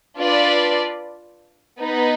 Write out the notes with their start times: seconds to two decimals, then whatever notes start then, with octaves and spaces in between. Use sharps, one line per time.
0.19 D4 F4 B4 D5
1.79 B3 D#4 B4